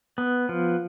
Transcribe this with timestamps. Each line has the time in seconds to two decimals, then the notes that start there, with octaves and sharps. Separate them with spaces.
0.18 B3
0.49 F3